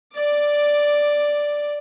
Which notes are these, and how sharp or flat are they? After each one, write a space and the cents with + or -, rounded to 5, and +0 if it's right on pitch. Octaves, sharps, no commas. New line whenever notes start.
D5 +0 D6 +10